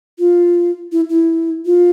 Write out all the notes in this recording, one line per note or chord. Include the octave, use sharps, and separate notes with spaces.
F4
E4
E4
F4